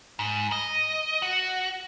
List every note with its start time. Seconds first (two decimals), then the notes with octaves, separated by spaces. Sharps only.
0.19 G#2
0.52 D#5
1.22 F#4